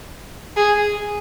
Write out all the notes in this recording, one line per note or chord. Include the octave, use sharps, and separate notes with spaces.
G#4